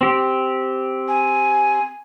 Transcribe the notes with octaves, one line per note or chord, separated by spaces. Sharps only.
C4 G4
G#5